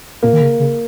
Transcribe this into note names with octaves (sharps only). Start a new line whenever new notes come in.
A#2 A#3
D#3
C#3
C#3